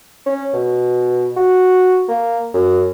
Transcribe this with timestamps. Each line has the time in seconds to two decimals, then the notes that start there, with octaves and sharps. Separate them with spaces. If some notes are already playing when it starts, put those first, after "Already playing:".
0.26 C#4
0.54 B2
1.37 F#4
2.09 A#3
2.54 F#2